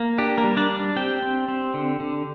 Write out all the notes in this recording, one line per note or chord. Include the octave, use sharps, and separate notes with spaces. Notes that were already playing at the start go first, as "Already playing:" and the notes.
Already playing: A#3
D4 G4
A#3 A#4
G3
D4 D5
D4
C4 G4 G5
C4
C4
D3
D3